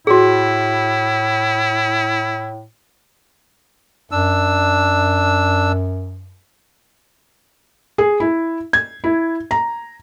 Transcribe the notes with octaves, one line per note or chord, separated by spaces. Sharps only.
A2 E4 F#4 G#4
F#2 D4 E6
G#4
E4
G#6
E4
A#5